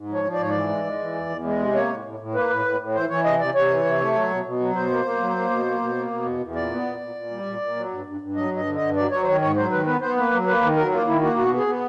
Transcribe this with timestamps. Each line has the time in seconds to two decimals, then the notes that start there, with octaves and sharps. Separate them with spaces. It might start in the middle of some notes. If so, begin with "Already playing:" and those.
Already playing: G#2
0.09 F3 C#5
0.24 F3
0.34 D5
0.39 G#2 C#5
0.50 E3 D5
0.69 G#3
0.84 G#3
0.99 E3
1.14 E2
1.29 E2
1.44 G#3
1.59 C3
1.74 A#3 C#5
1.89 A2
2.04 A2
2.19 A2
2.35 A#3 B4
2.50 A2
2.65 A2
2.80 A2
2.95 E3 C5
3.10 E3 C#5
3.24 C3 D#5
3.40 C3 D5
3.55 C3 C#5
3.70 E3
3.85 C3
4.00 A3
4.15 F#3
4.30 B2
4.45 B2
4.60 F#3
4.75 B2 C5
4.90 A#3
5.05 A#3
5.20 F#3
5.36 A#3
5.50 B2
5.65 A#3
5.80 B2
5.95 A#3
6.10 B2
6.25 E2
6.40 E2
6.55 A#2 D5
6.70 B3
6.85 A#2
7.01 A#2
7.15 A#2
7.31 G3
7.46 A#2
7.61 A#2
7.76 F#3
7.91 G2
8.06 G2
8.21 G2
8.36 F#3 D#5
8.51 G2
8.56 D#5
8.66 D3
8.76 D#5
8.81 G2
8.96 F#3 D5
9.11 F#3 C#5
9.22 C5
9.26 D#3 C#5
9.41 G#2 C#5
9.56 F#3 C5
9.71 D#3 B4
9.86 B3 B4
10.01 B3 C5
10.16 A#3 B4
10.31 F#3
10.47 A#3 B4
10.61 D#3
10.76 F#3 A#4
10.91 A#3 F4
11.07 D#3 E4
11.21 A#3 F#4
11.36 B2 F#4
11.52 B3
11.57 G#4
11.67 B3